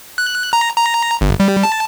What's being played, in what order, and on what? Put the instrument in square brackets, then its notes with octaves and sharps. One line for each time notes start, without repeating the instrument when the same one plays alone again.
[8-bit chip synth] F#6
A#5
A#5
G1
G3
A5